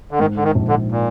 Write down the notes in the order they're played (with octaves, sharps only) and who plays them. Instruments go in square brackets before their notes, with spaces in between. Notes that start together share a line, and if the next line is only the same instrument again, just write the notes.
[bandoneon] D3
[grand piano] G#2 [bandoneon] D#3
[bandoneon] D3
D#3
[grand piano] A#1
[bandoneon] D3
A#2